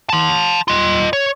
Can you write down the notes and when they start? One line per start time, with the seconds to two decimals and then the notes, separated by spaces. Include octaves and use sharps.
0.10 A5 C6
0.68 F4 D#5
1.13 C#5